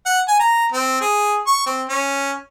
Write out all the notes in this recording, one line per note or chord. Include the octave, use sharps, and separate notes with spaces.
F#5
G#5
A#5
C4
G#4
C#6
C4
C#4